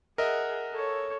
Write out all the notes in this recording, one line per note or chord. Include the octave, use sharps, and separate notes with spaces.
G#4 A#4 D#5 E5 F#5
A4 C#5